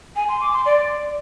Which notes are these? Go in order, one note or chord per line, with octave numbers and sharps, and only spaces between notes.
G#5
C6
D6
C6
D5